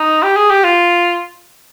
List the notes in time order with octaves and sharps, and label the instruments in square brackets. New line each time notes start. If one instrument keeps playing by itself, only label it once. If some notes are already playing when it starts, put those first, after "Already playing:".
Already playing: [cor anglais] D#4
G4
G#4
G4
F4